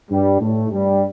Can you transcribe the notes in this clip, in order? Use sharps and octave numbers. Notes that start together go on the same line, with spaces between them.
G2 G3
A2 A3
G2 G3